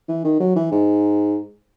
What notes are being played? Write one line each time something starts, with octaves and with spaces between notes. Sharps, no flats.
E3
D#3
F#3
E3
G#2